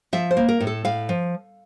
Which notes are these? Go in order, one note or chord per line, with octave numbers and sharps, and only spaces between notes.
F3 E5
C5
A#3
A#4
A2
A4
A2 F5
F3